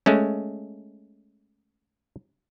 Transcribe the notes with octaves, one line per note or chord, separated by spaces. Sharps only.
G#3 A3 C#4